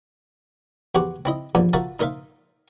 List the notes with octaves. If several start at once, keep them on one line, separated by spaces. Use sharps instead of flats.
E2 F#4 G4 C5 F#5
C4 E4 D#5
E2 G2 D3 F3
F4 F#4 A#4 C5 E5 A5
D#4 A#4 C5 E5 F5